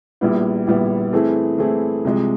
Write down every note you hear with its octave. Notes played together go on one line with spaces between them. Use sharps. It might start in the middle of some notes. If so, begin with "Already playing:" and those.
A#1 A#2 G3 B3 E4
A#1 A#2 G3 B3 E4
E3 A3 C4 E4 G#4
E3 A3 C4 E4 G#4
C2 C3 F3 G#3